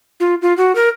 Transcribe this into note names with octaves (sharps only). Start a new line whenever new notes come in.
F4
F4
F#4
A#4